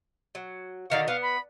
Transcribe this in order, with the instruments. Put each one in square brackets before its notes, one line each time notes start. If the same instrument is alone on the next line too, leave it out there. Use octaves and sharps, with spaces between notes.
[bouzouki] F#3
[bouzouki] D3 D#3 F#4 [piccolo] F5
[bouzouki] B3 [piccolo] F5
[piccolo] B5